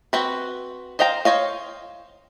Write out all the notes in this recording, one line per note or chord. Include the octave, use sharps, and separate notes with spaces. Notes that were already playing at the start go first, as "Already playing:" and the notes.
C4 F#4 B4
C5 D#5 F5 G5 A#5
C5 C#5 D#5 F5